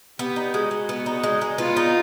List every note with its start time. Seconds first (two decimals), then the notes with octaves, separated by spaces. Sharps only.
0.19 B3 G4
0.36 D#4
0.54 G#3 F#4
0.71 G#3
0.89 B3
1.06 D#4
1.23 G#3
1.42 G#3
1.58 B3 F4
1.77 D#4